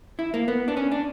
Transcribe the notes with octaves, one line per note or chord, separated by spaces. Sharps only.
E4
A#3
B3
D4
C#4
D4